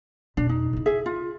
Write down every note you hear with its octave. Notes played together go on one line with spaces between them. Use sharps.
F2 B2 D4
D#4
C#3 E4
G#4 E5
F4